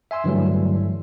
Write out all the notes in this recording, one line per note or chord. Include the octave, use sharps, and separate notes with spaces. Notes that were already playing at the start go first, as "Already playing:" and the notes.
E5 G#5 C6 E6
G2 D3 E3 F#3 G3 A3